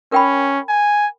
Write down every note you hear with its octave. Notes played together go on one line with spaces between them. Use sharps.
C#4 A#4 G5 B5
G#5